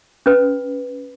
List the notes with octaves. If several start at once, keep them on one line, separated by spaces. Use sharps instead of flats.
C#4 B4 B5